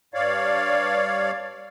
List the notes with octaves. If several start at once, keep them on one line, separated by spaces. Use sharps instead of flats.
G2 C#5 D5 F5